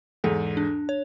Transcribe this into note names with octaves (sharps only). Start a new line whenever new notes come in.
E2 G#2 A4
D4
C#5